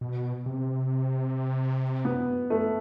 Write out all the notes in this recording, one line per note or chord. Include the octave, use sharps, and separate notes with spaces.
B2
C3
B3
A3